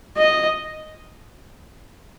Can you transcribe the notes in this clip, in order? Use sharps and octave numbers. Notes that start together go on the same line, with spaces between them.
D#5